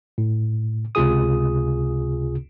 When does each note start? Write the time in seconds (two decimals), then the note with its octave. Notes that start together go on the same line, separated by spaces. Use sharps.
0.18 A2
0.95 C#2 C3 F4 G#4 D#6